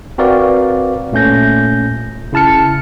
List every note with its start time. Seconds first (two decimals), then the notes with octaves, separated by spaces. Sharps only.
0.18 C4 F#4 A#4 B4 D5 F5
1.12 A#2 A3 C#4 G6 A#6
2.33 C#3 E4 A5 F6 C#7